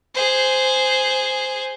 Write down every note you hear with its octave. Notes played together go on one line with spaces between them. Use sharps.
G#4 C5